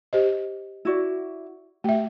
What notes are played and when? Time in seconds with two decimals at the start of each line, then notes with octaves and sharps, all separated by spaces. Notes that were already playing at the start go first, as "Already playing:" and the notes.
0.13 G4 C5 D#5
0.85 E4 F#4 D5
1.84 A3 G4 E5